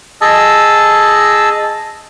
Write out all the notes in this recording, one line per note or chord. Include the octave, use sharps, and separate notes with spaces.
G#4 D#5 A5 E6